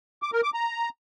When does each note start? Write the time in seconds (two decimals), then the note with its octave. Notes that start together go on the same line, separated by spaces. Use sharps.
0.22 D6
0.33 A#4
0.43 D6
0.54 A#5